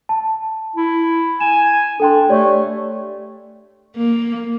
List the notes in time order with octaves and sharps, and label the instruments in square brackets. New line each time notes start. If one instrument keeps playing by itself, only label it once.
[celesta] A5
[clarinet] E4
[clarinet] G#5 [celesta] E7
[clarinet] D4 [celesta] A4 G5 C6
[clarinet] A3 [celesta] G4 C#5 D5
[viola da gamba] A#3